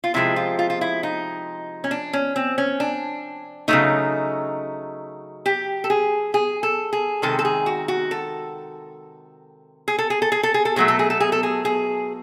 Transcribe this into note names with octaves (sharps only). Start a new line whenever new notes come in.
F4
C3 F3 G#3 E4
F4
F4
F4
E4
D#4
C#4
D4
C#4
C4
C#4
D4
C#3 F#3 A3 D#4
G4
A4
G#4
G#4
A4
G#4
C3 D#3 G#3 A4
A4
G#4
F#4
F#4
A4
G#4
A4
G#4
A4
G#4
A4
G#4
A4
B2 F#3 A3 G#4
A4
G#4
A4
G#4
A4
G#4
G#4